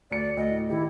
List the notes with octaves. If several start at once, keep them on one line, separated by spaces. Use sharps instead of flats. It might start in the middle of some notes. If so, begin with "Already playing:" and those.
D2 D5 C#7
D2 D#5
A2
D#3 E4 G4